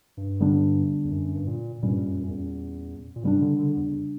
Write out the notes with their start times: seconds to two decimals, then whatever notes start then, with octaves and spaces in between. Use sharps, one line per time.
0.17 G2
0.40 D3 G3 B3 D4
1.04 E2
1.11 F#2
1.35 G2
1.47 A#2
1.82 G2 A#2 G3 C#4
2.06 F#2
2.23 F#2
2.30 E2
3.16 A#2
3.23 G2 C#3 G3 A#3 D4
3.41 D3
3.59 D3
3.77 E2